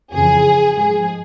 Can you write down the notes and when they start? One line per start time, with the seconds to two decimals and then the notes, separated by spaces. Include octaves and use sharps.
0.13 F2 C#3 E3 G#4
0.78 G#2 F3 G#4